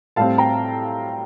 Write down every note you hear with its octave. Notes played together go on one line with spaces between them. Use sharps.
A2 G3 C4 F5 A5
G5 A#5